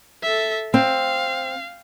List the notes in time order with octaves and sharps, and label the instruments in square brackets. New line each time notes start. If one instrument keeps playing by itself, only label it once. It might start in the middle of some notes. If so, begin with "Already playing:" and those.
[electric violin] A4 E5
[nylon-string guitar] C4 [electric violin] F5